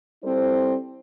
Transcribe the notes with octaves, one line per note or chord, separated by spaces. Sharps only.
G3 C4 E4 A4 C5